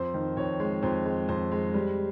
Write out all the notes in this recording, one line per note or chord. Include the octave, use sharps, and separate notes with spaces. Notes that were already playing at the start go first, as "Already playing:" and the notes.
Already playing: F2 C5
D#3
F2 C#5
G#3
F2 C5
G#3
F2 C5
G#3
G3